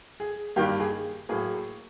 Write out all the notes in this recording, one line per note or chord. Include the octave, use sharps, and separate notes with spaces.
G#4
G2 D#3 G3 A#3 G4
G#4
A2 F#3 A#3 G#4